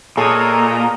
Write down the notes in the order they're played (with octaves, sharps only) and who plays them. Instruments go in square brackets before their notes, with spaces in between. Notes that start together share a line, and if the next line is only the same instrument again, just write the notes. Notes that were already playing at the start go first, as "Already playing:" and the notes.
[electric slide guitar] A#2 [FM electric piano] G#4 D#6 [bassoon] A4 [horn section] C#5 D#5 A#5